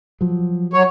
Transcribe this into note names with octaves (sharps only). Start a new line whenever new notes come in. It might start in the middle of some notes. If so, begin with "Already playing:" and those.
F3 F#3
F#3 C#5